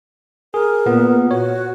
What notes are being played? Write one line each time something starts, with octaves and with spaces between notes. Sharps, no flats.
G#4 A#4
A#2 B3
F#4 C#5